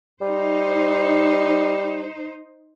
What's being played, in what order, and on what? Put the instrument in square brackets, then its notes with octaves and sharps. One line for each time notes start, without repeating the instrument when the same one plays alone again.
[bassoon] G3 [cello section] D#4 C5